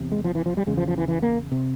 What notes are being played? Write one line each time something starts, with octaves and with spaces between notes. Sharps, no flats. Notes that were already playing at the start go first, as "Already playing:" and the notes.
Already playing: E2 C3
G#3
F3
E3
F3
G3
E2 C#3 G#3
F3
F3
E3
E3
A#3
C3